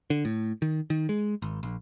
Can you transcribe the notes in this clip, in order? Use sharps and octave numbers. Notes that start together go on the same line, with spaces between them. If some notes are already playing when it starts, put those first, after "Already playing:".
D3
A2
D#3
D#3
G#3
G#1
A#1